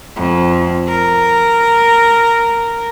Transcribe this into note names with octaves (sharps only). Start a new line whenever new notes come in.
F2
A#4